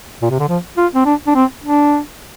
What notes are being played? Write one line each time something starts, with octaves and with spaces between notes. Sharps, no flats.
A#2
C3
D3
F3
F4
C4
D4
D4
C4
D4